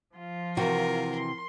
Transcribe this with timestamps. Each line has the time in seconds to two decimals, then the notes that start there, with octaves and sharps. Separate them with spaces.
0.15 F3 F4
0.57 C3 E3 F#4 A#4
1.13 C6